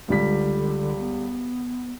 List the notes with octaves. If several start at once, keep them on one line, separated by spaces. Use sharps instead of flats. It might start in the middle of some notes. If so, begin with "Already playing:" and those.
C#2 D3 G3 B6
B3